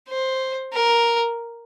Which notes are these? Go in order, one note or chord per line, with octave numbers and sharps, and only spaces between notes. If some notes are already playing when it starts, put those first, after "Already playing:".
C5
A#4